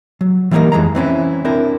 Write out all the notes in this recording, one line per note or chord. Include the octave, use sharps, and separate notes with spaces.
F#3
E3 G3 A#3 C#4 D#4 A#4
F2 E3 G#3 A#5
E3 C4 C#4 E4
C4 D4 E4 A#4